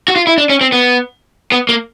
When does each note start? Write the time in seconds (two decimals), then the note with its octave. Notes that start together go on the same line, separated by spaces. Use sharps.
0.08 F#4
0.16 F4
0.27 E4
0.38 D4
0.49 C#4
0.61 C4
0.72 B3
1.52 B3
1.69 A#3